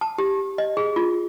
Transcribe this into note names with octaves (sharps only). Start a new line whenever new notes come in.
A5
G4
D#5
G#4
F4